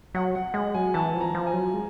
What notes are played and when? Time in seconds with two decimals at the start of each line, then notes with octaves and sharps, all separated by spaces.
0.14 F#3 F#5
0.35 F#5
0.54 G#3 F#5
0.74 F#3 G#5
0.94 E3 A5
1.14 F3
1.21 A#5
1.35 F3
1.47 G#5
1.53 F#3
1.74 G#3